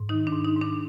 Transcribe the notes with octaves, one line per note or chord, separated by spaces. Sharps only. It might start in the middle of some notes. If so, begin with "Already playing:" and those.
Already playing: G#2
D#3 D#4
D4
G#2
D#4
G#2
D4